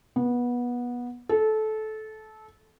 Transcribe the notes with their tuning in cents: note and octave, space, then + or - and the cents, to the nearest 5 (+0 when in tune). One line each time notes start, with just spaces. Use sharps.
B3 -20
A4 -20